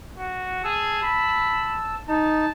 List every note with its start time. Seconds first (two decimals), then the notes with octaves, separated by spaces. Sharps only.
0.18 F#4
0.64 G#4 A5 E6
1.03 B5
2.08 D#4 A5